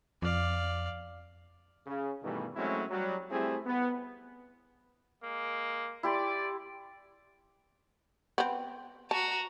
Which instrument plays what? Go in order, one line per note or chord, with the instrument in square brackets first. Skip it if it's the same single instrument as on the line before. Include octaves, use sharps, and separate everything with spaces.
[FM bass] F2 [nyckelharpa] D5 F5
[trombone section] C#3
G2 B2 D#3 E3 G3 A3
F#3 G#3 A3 C4 C#4 E4
F#3 G3
G3 A3 C4 E4 G4 G#4
B3
[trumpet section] G#3 A#3
[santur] E4 G4 C6 [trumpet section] D5
[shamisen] B3 C4
[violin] F#4 A#5 [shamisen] A5